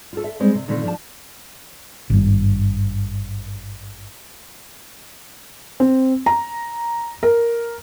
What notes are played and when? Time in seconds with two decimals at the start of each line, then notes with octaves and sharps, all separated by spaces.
0.13 F4 G4 A4
0.24 E5
0.40 G3 G#3 C4 C5
0.55 C3
0.68 A#2 D3 D#3 A3 C4
0.84 F3 D4 A5
2.10 G#1 G2
5.80 C4
6.26 A#5
7.23 A#4